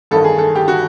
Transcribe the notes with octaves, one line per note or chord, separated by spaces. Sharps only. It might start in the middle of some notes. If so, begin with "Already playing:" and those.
A1 G2 D#3 A4
G#4
A4
G4
F#4